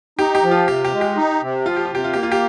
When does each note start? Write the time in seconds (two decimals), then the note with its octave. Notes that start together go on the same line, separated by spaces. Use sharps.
0.19 D#4 G4
0.35 G4
0.43 F3
0.51 F4
0.68 C3 G4
0.85 G4
0.93 G#3
1.01 G4
1.17 D#4
1.42 C3
1.66 F3 F4
1.76 G4
1.85 F4
1.92 C3 G4
2.04 F4
2.14 A#3 G4
2.23 F4
2.32 G4